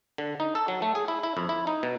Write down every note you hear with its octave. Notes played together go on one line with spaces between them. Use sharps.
D3
D#4
A4
F#3
A3
G#4
E4
E4
F2
E4
D#4
B2